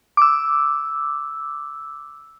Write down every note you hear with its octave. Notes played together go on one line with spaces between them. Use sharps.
D6 E6